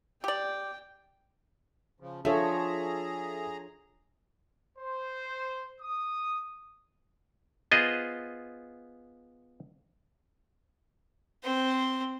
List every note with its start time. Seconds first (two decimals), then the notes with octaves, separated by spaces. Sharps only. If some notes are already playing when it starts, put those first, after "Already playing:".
0.24 G4 D5 G5
2.00 C#3 F3
2.25 F3 D4 G#4 A4 C#5 E5 A#5
4.77 C5
5.81 D#6
7.72 B3 F4 G#4 C5 D#5
11.44 C4 C5